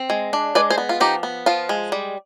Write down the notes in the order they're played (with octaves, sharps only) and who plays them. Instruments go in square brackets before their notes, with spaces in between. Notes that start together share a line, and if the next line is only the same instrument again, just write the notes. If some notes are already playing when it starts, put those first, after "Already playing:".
Already playing: [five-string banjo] C4
G#3
D4
G#3 B4 D5
G#4 C5
B3
F4
F3 D#4 G4
B3
F3 F4
G#3
G3